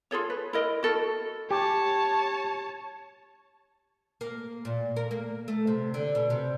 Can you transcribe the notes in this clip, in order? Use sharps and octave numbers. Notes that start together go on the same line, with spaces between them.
F4 G#4 A4 C#5
B4
E4 A#4 D#5
F#4 A4 A#4
G4 C#5 A5
A#3
A#2
A#4
A#3
A3
C3
D3
B2
C3